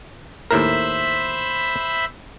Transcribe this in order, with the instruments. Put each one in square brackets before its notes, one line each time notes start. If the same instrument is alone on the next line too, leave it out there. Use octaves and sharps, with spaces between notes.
[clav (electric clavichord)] D#2 A2 A#4 [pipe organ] C5 E5 B5